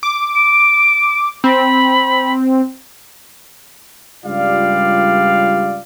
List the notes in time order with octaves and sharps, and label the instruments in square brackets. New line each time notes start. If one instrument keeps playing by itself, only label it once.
[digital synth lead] D6
[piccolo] D7
[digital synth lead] C4 [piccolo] B5
[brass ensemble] C#2 G2 G3 F4 D5 F5